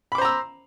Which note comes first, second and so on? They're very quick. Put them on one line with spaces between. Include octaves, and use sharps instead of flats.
B5 D6 C5 A#5 E6